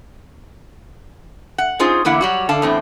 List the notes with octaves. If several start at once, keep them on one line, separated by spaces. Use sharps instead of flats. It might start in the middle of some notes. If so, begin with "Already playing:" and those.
F#5
C#4 D#4 F4 G#4 C5
E2 D3 A#3 E4 F#5
F#3 G3 F#4
D3 F5 A5
E2 A2 C4